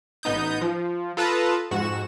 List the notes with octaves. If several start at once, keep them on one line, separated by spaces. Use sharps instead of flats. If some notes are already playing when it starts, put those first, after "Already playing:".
A1 B3 D#4 D#6 G6
F3
F4 A4 B4 A5 A#5 D#6
F2 G#2 F#4 E7